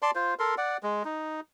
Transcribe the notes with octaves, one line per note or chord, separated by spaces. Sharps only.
D5 A5 C6
F4 C5
A4 A#4 C6
D5 F#5
G#3
D#4